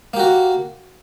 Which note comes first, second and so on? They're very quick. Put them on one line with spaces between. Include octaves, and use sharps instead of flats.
A#3 G4 F#4